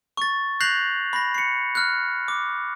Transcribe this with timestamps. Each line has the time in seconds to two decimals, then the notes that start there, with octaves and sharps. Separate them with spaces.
0.17 C#6 A6
0.60 F#6 G6 A#6 C7 F7 F#7
1.13 B5 A#6
1.34 C7 C#7
1.75 F6 F#6
2.28 D6